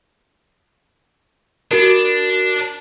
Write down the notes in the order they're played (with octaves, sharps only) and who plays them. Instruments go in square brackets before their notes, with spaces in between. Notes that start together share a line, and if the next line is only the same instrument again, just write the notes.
[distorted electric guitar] D4 [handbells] F#4 A#4